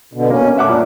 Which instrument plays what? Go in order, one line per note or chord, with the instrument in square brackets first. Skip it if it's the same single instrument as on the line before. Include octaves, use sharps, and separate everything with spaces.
[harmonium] B2 D3
[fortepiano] A#3 [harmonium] C#4
[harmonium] A3 [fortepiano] E5 F#5 D6
[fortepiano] A#2 [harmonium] D4